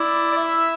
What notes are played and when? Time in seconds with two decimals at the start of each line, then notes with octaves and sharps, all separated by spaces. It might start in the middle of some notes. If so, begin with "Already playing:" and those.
Already playing: E4 D5
0.32 D5
0.37 E5